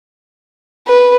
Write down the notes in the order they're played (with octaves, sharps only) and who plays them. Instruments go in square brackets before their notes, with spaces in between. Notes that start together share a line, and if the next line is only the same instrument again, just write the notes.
[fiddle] B4